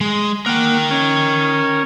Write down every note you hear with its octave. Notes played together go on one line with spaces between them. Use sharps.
G#3
A#3 A#4 F#5 G5
C#4